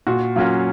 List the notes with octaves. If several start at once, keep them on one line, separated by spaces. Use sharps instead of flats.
A#2 F#4
F#3 A#3 C#4 F4 F#4